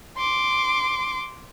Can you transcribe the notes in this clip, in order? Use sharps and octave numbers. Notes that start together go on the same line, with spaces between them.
C6 D6